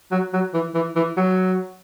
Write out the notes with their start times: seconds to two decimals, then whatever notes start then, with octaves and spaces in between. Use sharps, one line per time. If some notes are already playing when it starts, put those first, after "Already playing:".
0.11 F#3
0.33 F#3
0.54 E3
0.74 E3
0.96 E3
1.17 F#3